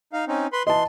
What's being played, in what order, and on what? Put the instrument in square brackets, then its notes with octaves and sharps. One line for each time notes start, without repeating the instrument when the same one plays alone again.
[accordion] D#4 F5
C4 C#4 D#4
B4 B5 C6
[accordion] E3 C6 [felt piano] D#5 A5